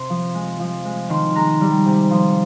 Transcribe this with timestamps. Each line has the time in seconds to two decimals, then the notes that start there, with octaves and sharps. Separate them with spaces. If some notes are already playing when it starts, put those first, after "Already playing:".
Already playing: C3 C6
0.10 F3
0.35 G#3
0.60 F3
0.85 G#3
1.09 D#3 C6
1.35 G#3 A#5
1.61 G3
1.86 C3
2.11 F3 C6